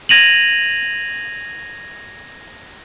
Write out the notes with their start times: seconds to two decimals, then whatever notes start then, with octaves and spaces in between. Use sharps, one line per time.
0.09 G#6 A#6 D#7 F7 F#7